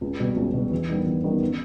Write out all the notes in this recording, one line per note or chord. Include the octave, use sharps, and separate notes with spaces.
C#2
B2 G3
C#2
B2 G3
E2
D#3 G3 B3 D#4
E2
D#3 G3 B3 D#4
C#3